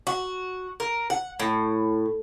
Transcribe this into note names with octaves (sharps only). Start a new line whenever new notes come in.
F#4
A#4
F#5
A2